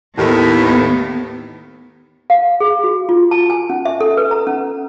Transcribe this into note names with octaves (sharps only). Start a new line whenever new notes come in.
D#2 A2 D#3 B3
F5
G#4
F#4
F4
A5
G#5
C#4
E5
A4
B4
A#5
C#4